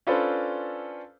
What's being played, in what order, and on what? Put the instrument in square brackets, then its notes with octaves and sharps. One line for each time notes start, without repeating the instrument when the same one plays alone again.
[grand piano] C#4 D4 F4 A4 B4 C5